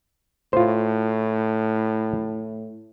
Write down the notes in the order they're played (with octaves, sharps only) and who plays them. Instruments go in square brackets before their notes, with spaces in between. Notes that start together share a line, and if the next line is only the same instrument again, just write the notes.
[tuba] A2 [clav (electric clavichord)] F4 C5